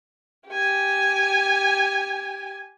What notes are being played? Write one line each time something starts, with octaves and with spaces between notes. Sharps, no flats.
G4 G#5